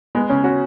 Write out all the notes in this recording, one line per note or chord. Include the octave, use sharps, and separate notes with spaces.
G#3 B3
C#3 C#4
C#4 F#4